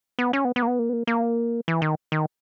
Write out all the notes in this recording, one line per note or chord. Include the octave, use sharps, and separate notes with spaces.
B3
C#4
B3
B3
A#3
B3
A#3
B3
A#3
A#3
E3
D#3
D#3